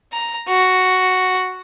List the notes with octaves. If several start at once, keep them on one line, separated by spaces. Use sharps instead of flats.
A#5
F#4